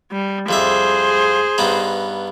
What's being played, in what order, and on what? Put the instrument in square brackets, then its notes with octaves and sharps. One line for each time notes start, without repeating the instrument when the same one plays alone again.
[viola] G3
[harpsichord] F2 G3 E5 [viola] G#4 C5
[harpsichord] G2 B3 D#4